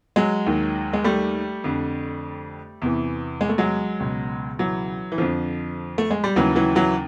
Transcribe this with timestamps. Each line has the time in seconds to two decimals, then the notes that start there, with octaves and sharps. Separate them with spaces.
0.16 F#3 G#3
0.46 D#2 D#3
0.93 G#3
1.04 G3 A3
1.64 F2 D3
2.82 E2 C3 E3
3.41 G#3
3.49 A3
3.58 F#3 G#3
4.00 C#2 B2
4.59 E3 F#3
5.12 E3
5.18 F2 D3 F3
5.98 A3
6.11 G#3
6.24 G3
6.36 D#2 C#3 E3 F#3
6.56 E3 F#3
6.75 E3 F#3